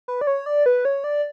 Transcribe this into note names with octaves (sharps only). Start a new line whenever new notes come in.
B4
D5
C#5
D5
B4
C#5
D5